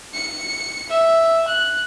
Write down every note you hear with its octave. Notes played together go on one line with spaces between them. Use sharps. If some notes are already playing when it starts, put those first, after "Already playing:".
C#7
E5
F#6